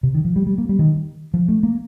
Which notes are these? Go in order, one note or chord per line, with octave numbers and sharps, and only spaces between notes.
C3
D#3
F3
G3
G3
A#3
G3
D#3
F3
A3
A#3